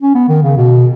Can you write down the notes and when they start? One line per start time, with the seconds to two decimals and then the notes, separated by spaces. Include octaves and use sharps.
0.02 C#4
0.15 B3
0.29 D#3
0.43 C#3
0.57 B2